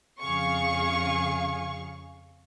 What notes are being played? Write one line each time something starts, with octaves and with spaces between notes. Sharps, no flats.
F2 C#3 G#4 F5 C#6